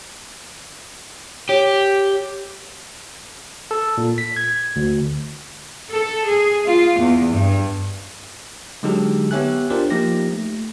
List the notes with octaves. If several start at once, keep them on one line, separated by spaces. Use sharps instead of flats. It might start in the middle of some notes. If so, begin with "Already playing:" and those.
G4 C#5
A4
A#2
B6
G#6
D2
A4
G#4
F4
E2
G2
D3 F#3 G#3 D#4 G4 A4
B3 G4 C#5 E5 G#5 F#6
D4 F4 G4 A#4 C5 D5
F3 A#3 D#4 G4 A#6
A3